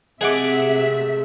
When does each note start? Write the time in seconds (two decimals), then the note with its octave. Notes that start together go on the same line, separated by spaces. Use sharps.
0.21 C3 G#3 A3 G#4 E5 F#5 D6